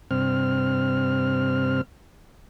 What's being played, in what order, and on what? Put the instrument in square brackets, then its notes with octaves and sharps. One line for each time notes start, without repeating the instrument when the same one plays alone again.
[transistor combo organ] G2 C3 C4 F6